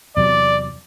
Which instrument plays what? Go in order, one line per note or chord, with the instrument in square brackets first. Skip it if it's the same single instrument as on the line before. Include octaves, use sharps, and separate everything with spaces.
[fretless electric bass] E2 C3 F#3 [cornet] D5